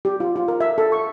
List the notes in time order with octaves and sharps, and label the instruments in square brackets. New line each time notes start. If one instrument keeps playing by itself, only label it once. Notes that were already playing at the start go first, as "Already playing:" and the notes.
[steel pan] G4
F4
F4
A#4
E5
A4
C#6